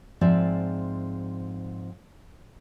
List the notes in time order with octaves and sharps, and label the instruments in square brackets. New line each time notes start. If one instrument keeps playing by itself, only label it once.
[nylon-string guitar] G#2 F3 C4 G#4 D5 E5